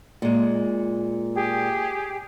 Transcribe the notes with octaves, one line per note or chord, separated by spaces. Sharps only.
A#2 G#3
G4 G#4